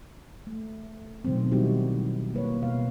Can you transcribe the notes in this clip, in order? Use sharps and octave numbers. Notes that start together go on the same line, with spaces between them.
A3
B2 D#3 F#3 A3 C4
G3 C4 D#4 E4 F#4 G4
A#3 B4 C#5
B2 A#3 B3 B4 F5